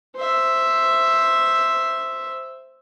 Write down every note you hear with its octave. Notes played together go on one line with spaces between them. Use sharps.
C5 E5